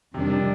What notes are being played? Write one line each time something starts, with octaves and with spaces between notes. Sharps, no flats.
F2 C3 D#3 G3 D4
C3